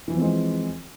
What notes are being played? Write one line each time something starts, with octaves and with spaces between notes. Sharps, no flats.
E3 F3 G#3 C4